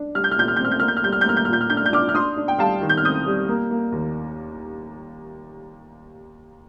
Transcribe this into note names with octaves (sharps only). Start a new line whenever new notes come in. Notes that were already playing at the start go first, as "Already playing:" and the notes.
Already playing: D4
G3 F6
G6
F6
A#2 G6
F6
G6
C4 F6
G6
A#3 F6
G6
F6
G3 G6
F6
G6
A#3 F6
G6
F6
A#2 G6
F6
D4 G6
F6
G6
D4 D6 F6
F6
D4 C6 D#6
D4
G5
G3 F5 A5
D#3
G6
F6
C4 D#6 G6
G3
A#3
A#3
D#2